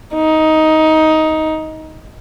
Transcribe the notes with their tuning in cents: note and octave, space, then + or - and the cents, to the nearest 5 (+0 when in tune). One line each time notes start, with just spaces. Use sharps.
D#4 +15